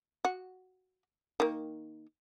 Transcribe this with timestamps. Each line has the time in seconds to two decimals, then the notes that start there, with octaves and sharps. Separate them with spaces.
0.25 F#4
1.40 D#3 A#3